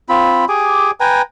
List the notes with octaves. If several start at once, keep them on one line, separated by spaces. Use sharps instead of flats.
C4 F4 B5
G4 G#4 G#5 D6
B4 G5 G#5 A#5